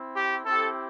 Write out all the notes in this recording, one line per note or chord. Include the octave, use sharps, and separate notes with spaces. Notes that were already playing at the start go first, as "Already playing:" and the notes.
Already playing: C4 E4
G4
C4 E4 G4 A4